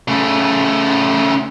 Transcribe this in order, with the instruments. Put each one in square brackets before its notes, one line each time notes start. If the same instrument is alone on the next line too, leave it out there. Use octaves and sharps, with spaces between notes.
[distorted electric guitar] C#3 A3